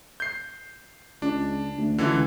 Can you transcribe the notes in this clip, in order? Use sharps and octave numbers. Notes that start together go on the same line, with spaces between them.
G6 C7
C#2 D4
D2
C#2 D3 E3